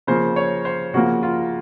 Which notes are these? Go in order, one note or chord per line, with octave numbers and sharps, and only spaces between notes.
C#3 F3 A#3 C5
C#5
C5
C#3 F3 A#3 F#4
F4